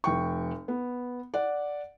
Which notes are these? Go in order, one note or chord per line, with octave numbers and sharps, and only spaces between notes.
F1 G5 C#6
B3
D5 F#5